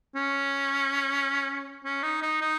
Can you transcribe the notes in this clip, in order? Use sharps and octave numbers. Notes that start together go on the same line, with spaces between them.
C#4
C#4
D#4
D#4
D#4